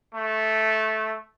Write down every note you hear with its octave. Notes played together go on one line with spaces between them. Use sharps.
A3